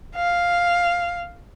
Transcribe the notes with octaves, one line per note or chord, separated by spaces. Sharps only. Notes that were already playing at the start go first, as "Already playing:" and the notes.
F5